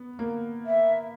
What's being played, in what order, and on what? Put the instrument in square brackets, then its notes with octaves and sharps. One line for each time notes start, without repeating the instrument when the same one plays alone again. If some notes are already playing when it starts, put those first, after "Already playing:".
Already playing: [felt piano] B3
A#3
[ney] E5